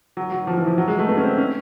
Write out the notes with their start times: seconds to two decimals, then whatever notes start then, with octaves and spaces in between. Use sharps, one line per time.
0.17 F#3
0.32 F#3
0.47 F3
0.57 E3
0.67 F3
0.78 F#3
0.88 G#3
0.99 A3
1.08 B3
1.17 C#4
1.23 C4
1.38 C#4